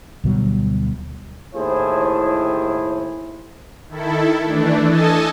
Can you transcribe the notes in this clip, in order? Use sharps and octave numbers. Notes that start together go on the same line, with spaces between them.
D2 B2 F#3 G3
D#2 A2 E4 G#4 C5
D#3 E4 A4
E3 A3 D4
A4 D#5 G#5 A5